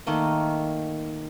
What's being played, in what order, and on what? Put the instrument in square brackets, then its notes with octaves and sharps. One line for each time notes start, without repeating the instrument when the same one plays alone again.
[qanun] D#3 A3 A#3 D#5